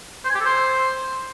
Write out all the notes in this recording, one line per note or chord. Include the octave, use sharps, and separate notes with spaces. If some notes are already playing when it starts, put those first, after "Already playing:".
C5
G#5
G4
A4
C5